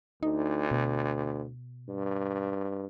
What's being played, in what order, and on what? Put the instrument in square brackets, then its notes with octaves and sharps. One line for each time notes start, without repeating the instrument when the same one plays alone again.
[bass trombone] D2 [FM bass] D#4
[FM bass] B2
[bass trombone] G2